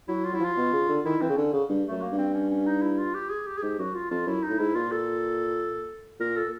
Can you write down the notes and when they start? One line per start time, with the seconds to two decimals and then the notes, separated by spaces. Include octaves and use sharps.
0.08 F#3 E4
0.25 F4
0.33 F#3 E4
0.41 F3 F4
0.57 B2
0.73 C#3
0.89 D3
1.05 D#3 E4
1.21 E3 C4
1.30 C#3
1.37 D3 C#4
1.53 C#3
1.69 G2
1.86 A3
1.91 F#2
2.01 A#3
2.13 G2
2.18 C4
2.34 C#4
2.50 C#4
2.66 D#4
2.82 E4
2.98 F4
3.14 G4
3.30 G#4
3.47 G4
3.58 G#4
3.63 G#2 G4
3.79 F#2 F#4
3.94 F4
4.11 F2 F4
4.27 F#2 E4
4.43 D#4
4.49 A2
4.59 G#2 E4
4.75 A#2 F4
4.91 A4
6.20 A#2 A#4
6.37 A4